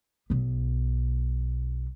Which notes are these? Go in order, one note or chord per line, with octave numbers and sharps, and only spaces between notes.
B1 B3